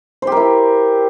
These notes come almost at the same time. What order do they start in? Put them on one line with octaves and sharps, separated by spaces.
C5 G4 A#4 E4